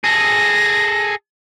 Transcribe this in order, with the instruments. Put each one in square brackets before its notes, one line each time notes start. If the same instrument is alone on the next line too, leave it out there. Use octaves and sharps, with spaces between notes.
[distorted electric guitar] G#4 A4 [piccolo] A#6